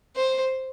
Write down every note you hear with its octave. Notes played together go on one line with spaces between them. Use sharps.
C5